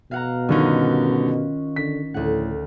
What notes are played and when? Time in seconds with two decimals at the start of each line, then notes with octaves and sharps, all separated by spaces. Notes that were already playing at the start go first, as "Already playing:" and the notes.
0.11 B2 F5 F#5 A#5
0.49 G2 D3 D#3 C#4 D#4 F4
1.76 D3 B6
2.14 D2 A2 F#5